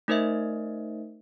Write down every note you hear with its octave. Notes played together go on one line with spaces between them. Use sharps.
A3 D#4 A#4 C5 D#5 E5